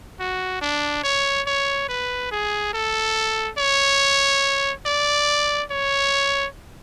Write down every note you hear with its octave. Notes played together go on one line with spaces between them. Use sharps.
F#4
D4
C#5
C#5
B4
G#4
A4
C#5
D5
C#5